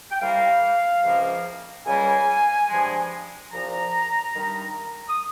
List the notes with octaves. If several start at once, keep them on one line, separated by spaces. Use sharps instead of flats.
G5
C2 C3 G3 A#3 F5
C#2 C3 F3 A#3
C#2 C#3 G3 A#3 G#5
G2 F3 G#3
C2 A#2 F3 A#5
G2 D#3 G3
D#6